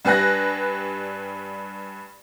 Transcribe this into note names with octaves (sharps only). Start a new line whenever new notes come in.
G2 G3 B4 G#5 F#6 A#6